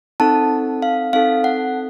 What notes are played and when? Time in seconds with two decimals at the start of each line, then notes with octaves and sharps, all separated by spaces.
0.20 C4 D#4 A4 A5
0.82 F5
1.13 C4 D#4 A4 F5
1.44 F#5